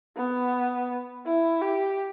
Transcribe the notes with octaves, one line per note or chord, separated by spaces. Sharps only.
B3
E4
G4